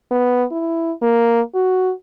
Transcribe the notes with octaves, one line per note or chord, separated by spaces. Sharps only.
B3
E4
A#3
F#4